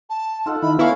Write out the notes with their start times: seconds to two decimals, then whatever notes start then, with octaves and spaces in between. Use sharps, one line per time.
0.10 A5
0.46 D#4 F4 A4 F#5
0.62 D#3 D#4 E4 B5
0.79 A3 B3 C#4 E4 A#4 C#5 F5